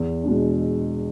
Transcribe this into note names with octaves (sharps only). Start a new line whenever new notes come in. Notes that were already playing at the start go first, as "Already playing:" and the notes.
Already playing: E2
B2 G#3 D4